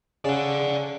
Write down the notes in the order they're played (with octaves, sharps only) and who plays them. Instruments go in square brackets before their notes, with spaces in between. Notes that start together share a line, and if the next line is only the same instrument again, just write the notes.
[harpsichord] C#3 [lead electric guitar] D5 F#5